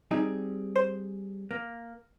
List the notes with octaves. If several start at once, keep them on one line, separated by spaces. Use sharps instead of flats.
G3 C4 D#4 G#4
C5
A#3